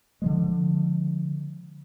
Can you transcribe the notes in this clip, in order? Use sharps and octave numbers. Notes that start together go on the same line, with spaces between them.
D3 F3 G#3